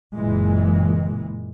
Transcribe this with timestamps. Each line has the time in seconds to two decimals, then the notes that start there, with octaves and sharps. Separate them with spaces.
0.14 F#1 A#2 E3 G#3